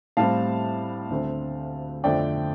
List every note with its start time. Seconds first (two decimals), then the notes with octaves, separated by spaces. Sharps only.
0.17 A2 G3 C4 F5 A5
1.10 D2 D3 A3 C4
2.04 F2 D3 A3 C4 D5 G5